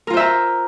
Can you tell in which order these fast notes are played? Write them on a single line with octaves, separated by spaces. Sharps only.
A#4 F4 C5 E5 A#5